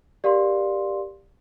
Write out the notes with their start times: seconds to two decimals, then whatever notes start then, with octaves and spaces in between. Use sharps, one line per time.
0.24 G4 A#4 D5 F5 C6